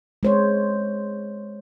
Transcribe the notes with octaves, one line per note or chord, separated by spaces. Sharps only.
G#3 C5 C#5